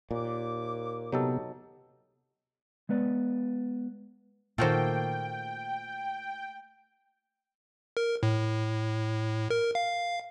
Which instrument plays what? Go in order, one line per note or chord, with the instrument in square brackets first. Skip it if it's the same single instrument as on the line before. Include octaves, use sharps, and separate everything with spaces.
[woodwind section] D#2 D6 [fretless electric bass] A#2
[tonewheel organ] C3 B3 G4 [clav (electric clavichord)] F#3 D#4 A4
[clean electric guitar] G#3 B3 B4 D5
[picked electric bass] A#2 D#3 [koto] A3 A#3 F#4 [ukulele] F4 C5 [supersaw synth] G5
[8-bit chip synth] A#4
A2
A#4
F5